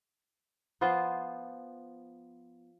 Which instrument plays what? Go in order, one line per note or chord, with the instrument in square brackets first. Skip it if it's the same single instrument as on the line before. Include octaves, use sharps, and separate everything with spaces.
[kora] F3 B3 F4 C5